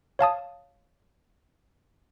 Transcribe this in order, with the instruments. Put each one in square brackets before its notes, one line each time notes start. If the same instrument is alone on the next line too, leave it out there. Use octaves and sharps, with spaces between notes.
[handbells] C#5 F5 A5 D#6